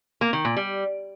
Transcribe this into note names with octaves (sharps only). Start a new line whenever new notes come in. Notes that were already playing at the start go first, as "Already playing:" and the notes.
A#3
D#3
A#2
G3